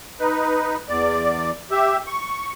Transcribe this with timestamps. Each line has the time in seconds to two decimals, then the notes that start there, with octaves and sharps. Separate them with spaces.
0.20 D#4 B4
0.89 E2 D5
1.71 G4 E5
2.07 C#6